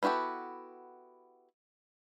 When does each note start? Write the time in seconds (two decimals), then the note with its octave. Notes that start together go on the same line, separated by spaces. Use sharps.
0.03 B3 E4 F#4 G4 A4